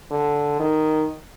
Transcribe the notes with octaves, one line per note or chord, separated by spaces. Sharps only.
D3
D#3